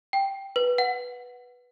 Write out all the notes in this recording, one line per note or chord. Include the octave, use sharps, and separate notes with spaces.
G5
B4
F#5